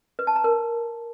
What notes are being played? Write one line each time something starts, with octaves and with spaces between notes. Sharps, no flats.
B4
A5
A#5
A#4